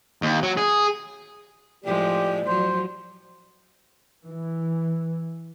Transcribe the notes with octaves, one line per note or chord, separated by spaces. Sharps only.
D#2
F#3
G#4
A2 F3 G#3 G4 D5
F3 F#3 C5
E3